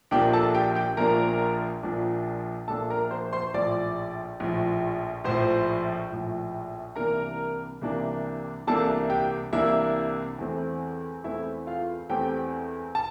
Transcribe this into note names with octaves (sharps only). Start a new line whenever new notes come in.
A#1 A#2 F3 A#3 D4 G4 G5
A4 A5
G4 G5
G4 G5
A#1 A#2 F3 A#3 D4 A#4 A#5
A#1 A#2 F3 A#3 D4
A#1 A#2 F3 A#3 D4 A4 A5
A#4 A#5
C5 C6
C5 C6
A#1 A2 F3 D5 D6
A#1 A2 F3
A#1 A2 F3 C5 C6
A#1 A2 F3
C2 C3 E3 A#3 D4 A#4 A#5
C2 C3 E3 A#3 D4
C2 C3 E3 A#3 D4 A4 A5
G4 G5
C2 C3 E3 A#3 D4 E4 E5
E2 E3 A3 C4
E2 E3 A3 C4 E4 E5
F4 F5
E2 E3 A3 C4 G4 G5
A5